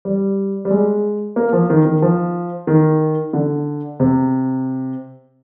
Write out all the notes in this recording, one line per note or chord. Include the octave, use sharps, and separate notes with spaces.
G3
G3
G#3
A#3
F3
D#3
D#3
F3
D#3
D3
C3